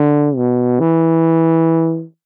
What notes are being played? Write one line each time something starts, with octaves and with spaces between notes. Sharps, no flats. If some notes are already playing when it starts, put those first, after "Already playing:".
Already playing: D3
B2
E3